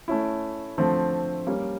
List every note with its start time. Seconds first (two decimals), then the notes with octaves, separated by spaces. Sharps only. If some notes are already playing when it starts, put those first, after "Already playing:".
0.08 A3 C#4 E4
0.77 D3 F3 A3 C4
1.47 G3 A#3 C#4